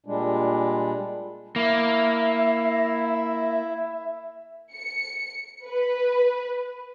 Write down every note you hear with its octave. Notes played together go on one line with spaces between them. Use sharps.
A#2 G3 G#3 D4
A#3 E4 E5
C#7
B4